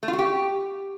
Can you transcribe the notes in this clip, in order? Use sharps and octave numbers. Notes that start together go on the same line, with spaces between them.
A3
F4
F#4
G4